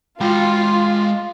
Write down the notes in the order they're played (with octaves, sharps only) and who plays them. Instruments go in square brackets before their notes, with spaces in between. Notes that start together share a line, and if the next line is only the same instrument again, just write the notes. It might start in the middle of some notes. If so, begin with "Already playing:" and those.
[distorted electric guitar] G#3 G5 [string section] F4